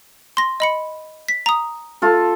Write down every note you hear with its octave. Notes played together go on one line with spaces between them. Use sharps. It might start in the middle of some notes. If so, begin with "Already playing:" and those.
C6 A#6
D#5 B5 C#7
B6
A#5 D#6
F4 A4